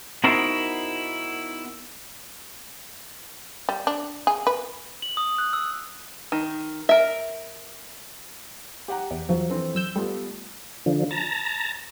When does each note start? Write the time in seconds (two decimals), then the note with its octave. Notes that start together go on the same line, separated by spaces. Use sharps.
0.24 B3 D#4 E4 F#4 A#4 C5
3.69 G3
3.87 D4
4.27 G#4
4.47 B4
5.02 F#7
5.17 D#6
5.38 F#6
5.53 E6
6.32 D#3
6.89 A#4 E5
8.88 G4 F#5 A#5
9.11 E2
9.29 E2 F3 F#3
9.49 E3 C4 A4
9.75 F#2 E6 G6
9.96 G3 A3 B3 F4
10.86 D3 F3
11.11 A5 A#5